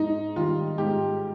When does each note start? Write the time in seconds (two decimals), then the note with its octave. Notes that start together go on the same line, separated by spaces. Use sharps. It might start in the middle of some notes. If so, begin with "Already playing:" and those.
Already playing: G#2 D#4
0.36 D#3 G3 F4
0.78 G#2 G4